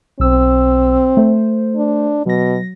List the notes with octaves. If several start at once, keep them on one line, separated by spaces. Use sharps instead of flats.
B1 C4 E6
A3 C5
D4
B2 F#3 A#6